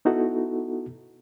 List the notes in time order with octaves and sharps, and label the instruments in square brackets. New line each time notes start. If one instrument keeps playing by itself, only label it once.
[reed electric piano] B3 D#4 E4 F#4 A4